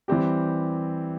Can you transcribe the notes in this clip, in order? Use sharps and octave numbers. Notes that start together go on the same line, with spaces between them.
E3 G3 C4 G4